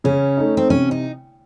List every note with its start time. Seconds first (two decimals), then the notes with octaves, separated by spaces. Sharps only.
0.04 C#3 C#4
0.37 A3 D#4
0.57 C4
0.70 C3 C#4
0.91 D#4